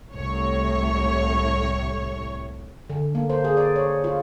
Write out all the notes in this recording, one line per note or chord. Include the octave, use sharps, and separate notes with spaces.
C2 A2 C#5
D3
A#3
C5
G#4
D5
C#5
F4